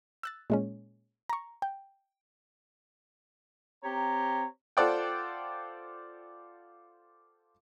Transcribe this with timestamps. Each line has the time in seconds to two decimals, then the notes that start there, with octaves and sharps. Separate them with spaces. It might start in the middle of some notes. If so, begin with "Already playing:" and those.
0.23 E6 F#6 A6
0.50 A#2 G#3 C#4
1.29 A#5 C#6
1.62 G5
3.83 C4 G4 C#5 A#5
4.77 F4 A4 C5 D5 F#5 G5